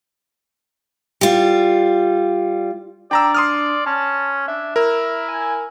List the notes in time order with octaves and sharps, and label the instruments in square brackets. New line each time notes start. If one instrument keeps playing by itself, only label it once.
[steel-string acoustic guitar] G3 F4
[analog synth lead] D4 [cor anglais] D5 [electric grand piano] G5 A#5 E6
[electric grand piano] C6 D#6 F6
[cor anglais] C#4 [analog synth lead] A5
[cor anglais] D4 [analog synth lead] E5
[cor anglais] E4 [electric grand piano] A#4
[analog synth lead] G#5